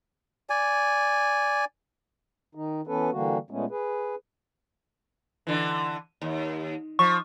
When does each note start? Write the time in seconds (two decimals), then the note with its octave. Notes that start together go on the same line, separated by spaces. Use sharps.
0.50 D5 G#5
2.55 D#3 D#4
2.87 E3 B3 C#4 A4 B4
3.11 D3 E3 G3 A#3 F#4
3.50 A#2 G#3 A3 B3 C#4
3.70 G#4 B4
5.47 D3 E3
6.21 D#2
6.99 F3 C#6